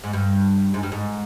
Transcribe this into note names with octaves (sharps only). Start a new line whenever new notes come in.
G#2
G2
G#2
G2
G#2